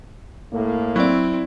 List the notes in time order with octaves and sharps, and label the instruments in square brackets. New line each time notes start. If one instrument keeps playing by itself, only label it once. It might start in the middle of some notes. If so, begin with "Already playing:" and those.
[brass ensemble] A2 A#3
[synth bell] F#3 D5 [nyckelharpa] C4 [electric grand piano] E4